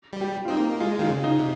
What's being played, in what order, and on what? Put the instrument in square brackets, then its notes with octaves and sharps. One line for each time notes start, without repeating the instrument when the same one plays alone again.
[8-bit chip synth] G3
[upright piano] G4
F4
[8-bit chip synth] C4 [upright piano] D#4
[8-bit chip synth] A#3
[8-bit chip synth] G#3 [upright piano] F4
[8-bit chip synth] D#3 [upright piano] F4
[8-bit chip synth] C#3
[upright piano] D#4
[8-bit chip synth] C3